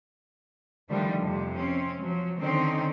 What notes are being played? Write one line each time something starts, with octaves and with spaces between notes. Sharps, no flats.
D3 D#3 F3 G3 A3 D4
F2 C3
C4 C#4
F3 F#3
D3 D#3 C4 C#4 D#4